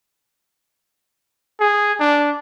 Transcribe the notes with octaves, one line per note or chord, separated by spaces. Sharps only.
G#4
D4